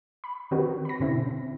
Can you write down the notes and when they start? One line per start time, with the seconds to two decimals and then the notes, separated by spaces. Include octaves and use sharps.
0.24 B5
0.51 D#3 C4 F#4 G4 A#4 B4
0.85 B5 A#6
1.00 G#2 B2 D3 C4 C#4 E4